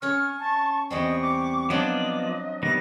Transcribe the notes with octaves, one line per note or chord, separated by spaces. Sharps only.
C#4 C#5 C#6 F6
A5
E2 G3 C4 D#5 C#6
D6
F3 F#3 B3 D4 F4 D5 D#5 D6
D#3 G3 B3 A#6